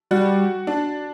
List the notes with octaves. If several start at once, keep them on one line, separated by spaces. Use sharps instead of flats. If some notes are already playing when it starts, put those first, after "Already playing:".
G3 F#4
D4